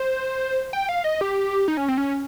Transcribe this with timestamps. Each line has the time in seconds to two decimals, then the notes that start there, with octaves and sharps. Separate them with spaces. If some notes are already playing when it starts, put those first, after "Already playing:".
Already playing: C5
0.73 G5
0.89 F5
1.04 D#5
1.21 G4
1.68 D#4
1.77 C#4
1.88 C4
1.98 C#4